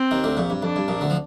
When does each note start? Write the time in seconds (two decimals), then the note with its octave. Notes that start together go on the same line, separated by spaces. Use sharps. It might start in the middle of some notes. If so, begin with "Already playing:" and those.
Already playing: C4
0.11 D#2 D#3
0.24 D2 D3
0.37 A#1 A#2
0.50 G2
0.63 F2 D4
0.76 G2
0.88 A#1 A#2
1.01 D2 D3
1.10 F3